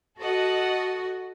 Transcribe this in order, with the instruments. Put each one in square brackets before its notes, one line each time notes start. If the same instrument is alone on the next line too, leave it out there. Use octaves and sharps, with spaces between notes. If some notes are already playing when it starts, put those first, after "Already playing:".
[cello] F#4 [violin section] A4 D#5 F#5